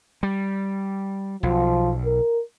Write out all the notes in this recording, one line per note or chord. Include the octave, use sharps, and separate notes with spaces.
G3
B1 F3
A#4